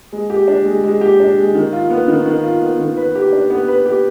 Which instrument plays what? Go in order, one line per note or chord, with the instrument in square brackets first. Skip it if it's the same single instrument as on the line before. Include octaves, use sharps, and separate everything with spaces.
[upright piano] G#3
G4
D4
G#3
G#3
G4
D4
G#3
D#3
F4
B3
D#3
D#3
F4
B3
D#3
B4
G4
D4
B3
B4
G4